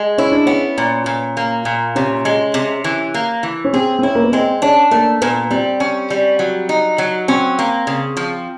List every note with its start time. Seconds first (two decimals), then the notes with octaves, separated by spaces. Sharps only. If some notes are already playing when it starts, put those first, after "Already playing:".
Already playing: G#3
0.18 C#4 E4
0.32 D4
0.46 B3 C#4
0.78 A#2
1.06 A#2
1.37 A#3
1.65 A#2
1.95 C3 C#4
2.25 G#3
2.54 C3
2.84 E3
3.14 A#3
3.43 E3
3.64 C#4
3.73 C4 G#4
3.99 C4
4.03 C#4 E4
4.15 A#3
4.24 B3
4.32 G#3 C4
4.62 C#4 D4
4.91 A3 A#3
5.21 A#2 B3
5.51 G3 C4
5.80 C#4
6.10 G3
6.39 F#3
6.69 D#4
6.98 F#3
7.28 C4 C#4
7.59 A#3
7.87 C#3
8.17 F3